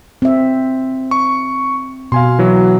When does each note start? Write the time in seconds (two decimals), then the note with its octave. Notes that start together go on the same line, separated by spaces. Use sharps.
0.22 C4 E5
1.11 C#6
2.12 B2 F5 G#5 C6
2.39 E3 F#3